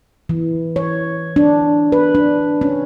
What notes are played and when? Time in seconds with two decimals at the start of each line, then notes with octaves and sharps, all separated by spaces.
0.29 E3
0.76 C#5
1.36 D4
1.92 B4
2.15 D4
2.61 C#4